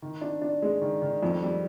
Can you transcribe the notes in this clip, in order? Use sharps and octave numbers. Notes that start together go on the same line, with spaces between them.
D#3
D4
D4
G#3
D#3
D#3
F2
G3